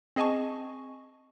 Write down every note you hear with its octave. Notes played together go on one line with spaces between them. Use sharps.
C4 G#4 D#5 G#5 A5 C#6